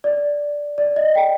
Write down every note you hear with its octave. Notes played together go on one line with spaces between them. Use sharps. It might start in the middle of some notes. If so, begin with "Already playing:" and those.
D5
D5
D#5
G5